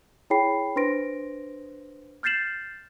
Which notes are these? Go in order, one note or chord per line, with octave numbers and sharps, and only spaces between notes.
E4 G#4 C#5 G5 B5 C7
D4 B4 C5 C6 A#6 D7
F6 G6 A6 C7 E7 F#7